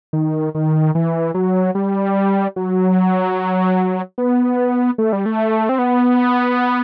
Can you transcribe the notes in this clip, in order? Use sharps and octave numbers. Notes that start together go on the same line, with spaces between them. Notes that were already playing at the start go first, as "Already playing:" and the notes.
D#3
D#3
E3
F#3
G3
F#3
B3
A3
G3
A3
C4
B3